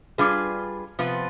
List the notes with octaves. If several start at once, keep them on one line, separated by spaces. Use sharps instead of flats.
G3 D4 F4 G#4 B4
C3 F3 B3 F4 B4